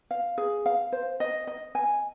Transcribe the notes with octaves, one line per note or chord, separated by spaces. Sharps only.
F5
G#4
F5
C5
D#5
D#5
G#5